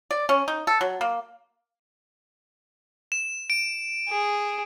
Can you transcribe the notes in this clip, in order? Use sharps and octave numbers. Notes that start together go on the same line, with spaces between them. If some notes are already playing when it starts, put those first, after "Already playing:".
D5
C#4
D#4
A4
F#3
A#3
E7
D7
G#4